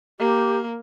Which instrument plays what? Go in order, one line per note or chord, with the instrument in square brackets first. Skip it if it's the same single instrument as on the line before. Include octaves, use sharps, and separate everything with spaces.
[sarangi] A#3 [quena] G4